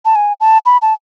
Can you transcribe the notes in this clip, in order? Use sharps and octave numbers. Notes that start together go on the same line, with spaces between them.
A5
G#5
A5
B5
A5